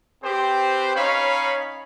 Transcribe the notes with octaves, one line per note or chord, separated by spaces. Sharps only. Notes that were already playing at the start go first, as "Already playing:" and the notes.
C4 G4 B4 C5
C#4 D#4 C#5 F5 B5